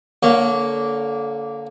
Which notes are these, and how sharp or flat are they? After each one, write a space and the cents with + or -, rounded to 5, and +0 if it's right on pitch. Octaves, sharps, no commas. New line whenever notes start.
D3 -20 A#3 +0 C#5 +0